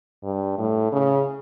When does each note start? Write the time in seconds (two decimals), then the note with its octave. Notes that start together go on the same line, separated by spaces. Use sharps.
0.24 G2
0.58 A2
0.93 C#3